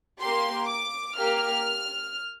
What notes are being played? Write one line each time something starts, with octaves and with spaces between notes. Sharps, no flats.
A#3 G4 C6
D6
A#3 G4 F6